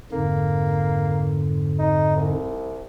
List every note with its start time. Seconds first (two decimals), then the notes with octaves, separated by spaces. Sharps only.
0.12 F2 G#2 D3 A#3
1.79 D#4
2.16 C2